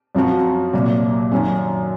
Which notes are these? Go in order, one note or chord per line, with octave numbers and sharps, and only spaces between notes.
F#2 F3 C4 F#4 C5
C2 A#2 F#3
F#2 D#3 F#3 C#4